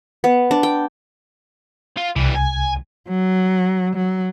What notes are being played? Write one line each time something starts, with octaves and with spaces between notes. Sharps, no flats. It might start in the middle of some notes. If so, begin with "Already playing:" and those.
B3
D4
G5
F4
C2 E3 G3
G#5
F#3
F#3